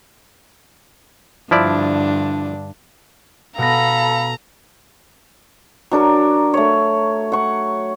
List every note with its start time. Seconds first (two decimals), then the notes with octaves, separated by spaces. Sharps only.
1.51 G2 D3 F3 D4 E4 D5
3.58 B2 B3 A4 F5 A#5 B5 A#6
5.91 F#3 D4 A#4
6.54 A3 C#5
7.32 F#5 C#6